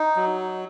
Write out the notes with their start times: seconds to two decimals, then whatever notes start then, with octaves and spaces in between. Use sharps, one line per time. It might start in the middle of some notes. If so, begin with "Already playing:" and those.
Already playing: D#4
0.16 F#3